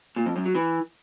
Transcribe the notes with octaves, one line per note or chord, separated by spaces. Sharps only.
A#2
F2
F#2
F#3
E3